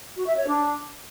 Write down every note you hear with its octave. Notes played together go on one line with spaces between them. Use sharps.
F#4
E5
C#5
D4